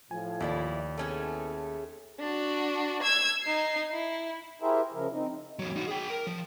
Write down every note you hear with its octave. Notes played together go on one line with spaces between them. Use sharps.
A2 F3 G#5
D#2 E4 F4 D5
A3 B3 C#4 E4 G#4 A4
D4 F#4
E6 G#6
D#4 C7
E4
E4 G4 G#4 A#4 C5 E5
C#3 F3 A#4
C4 D#4
E2 F#3
D#4 F#4
G#4 G5
A#4
F3